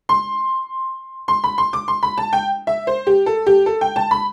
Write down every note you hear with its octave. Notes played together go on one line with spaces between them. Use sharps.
C6
C6
B5
C6
D6
C6
B5
A5
G5
E5
C5
G4
A4
G4
A4
G5
A5
B5